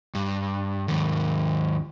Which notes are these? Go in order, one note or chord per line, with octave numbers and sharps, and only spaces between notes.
G2
D#2 G#2